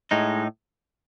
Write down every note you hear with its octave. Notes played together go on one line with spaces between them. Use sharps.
A2 G#3 D#4